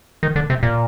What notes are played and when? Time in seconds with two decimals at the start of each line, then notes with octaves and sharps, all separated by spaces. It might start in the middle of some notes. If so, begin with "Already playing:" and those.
0.23 D#3
0.36 D3
0.50 C3
0.63 A#2